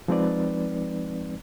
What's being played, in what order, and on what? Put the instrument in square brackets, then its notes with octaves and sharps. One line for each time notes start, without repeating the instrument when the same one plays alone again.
[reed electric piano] F3 G#3 C4 D#4 B4 D5